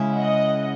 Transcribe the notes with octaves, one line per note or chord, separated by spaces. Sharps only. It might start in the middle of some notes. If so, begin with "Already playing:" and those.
Already playing: C#3 G#3 C#4 E4
D#5 F#5